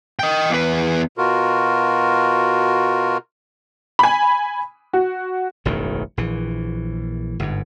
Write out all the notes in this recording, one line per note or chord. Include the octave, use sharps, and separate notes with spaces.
D#5 G5
E2 B4
B2 F4 F#4 A#4
G#5 B5
F#4
E1 A1 F#2 D#3
A#1 E3
G1 G#2